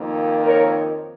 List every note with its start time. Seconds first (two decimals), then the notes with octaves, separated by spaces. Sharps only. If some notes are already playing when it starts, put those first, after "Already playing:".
Already playing: F2 D#3 A#3
0.44 A#4 C#5